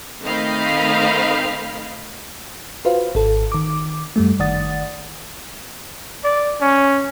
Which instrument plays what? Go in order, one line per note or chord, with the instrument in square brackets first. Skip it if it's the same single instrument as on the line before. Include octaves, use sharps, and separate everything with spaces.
[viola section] D#3 A3 C4 D#5 F5 B5
[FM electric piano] F4 F#4 B4 C5 F5
G#1 A4
D#3 D6
F#2 G3 A3
G1 D#3 D5 F#5 D#6 A6
[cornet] D5
C#4